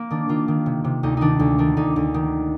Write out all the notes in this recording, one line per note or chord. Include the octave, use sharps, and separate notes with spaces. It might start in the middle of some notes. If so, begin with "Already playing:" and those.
Already playing: A#3 C4
D#3 D4
D#3 F4
D#3
C3
C3
D2 D#4
D#3 D4 D#4
D2
D#3 D4
D2 D#4
D2
D#3